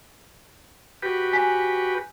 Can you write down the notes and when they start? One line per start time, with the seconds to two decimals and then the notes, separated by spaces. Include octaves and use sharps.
1.02 F#4 G4 B4
1.33 G#5 B6